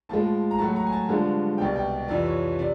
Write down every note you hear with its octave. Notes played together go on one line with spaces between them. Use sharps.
A2 F3 G#3 A5
A#5
A2 F#3 A3 A5
A#5
G#5
A5
G2 D3 F3 G#3
C2 B2 G3 G5
G5
F2 C3 E3 D5
C#5
C3 D5